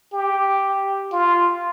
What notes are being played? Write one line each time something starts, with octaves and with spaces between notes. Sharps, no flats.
G4
F4